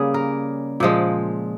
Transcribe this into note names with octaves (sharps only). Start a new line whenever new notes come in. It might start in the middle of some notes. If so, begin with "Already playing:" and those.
Already playing: C#3 G3 A#3 G#4
A#4
A#2 F3 G#3